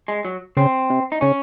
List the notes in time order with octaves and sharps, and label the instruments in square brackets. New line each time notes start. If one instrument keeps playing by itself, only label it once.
[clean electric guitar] G#3
F#3
[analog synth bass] C#3 [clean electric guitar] C4
[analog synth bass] C3
[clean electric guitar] D#4
[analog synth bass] C#3 [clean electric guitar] C#4